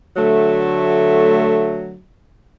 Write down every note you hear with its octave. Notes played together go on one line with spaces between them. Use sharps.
D3 F#3 A3